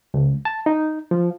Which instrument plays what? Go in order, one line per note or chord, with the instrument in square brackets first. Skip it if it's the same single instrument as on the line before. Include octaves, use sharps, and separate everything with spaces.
[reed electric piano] C#2
A5
D#4
F3